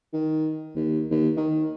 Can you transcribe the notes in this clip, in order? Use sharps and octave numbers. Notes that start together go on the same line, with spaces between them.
D#3
D#2
D#2
D#3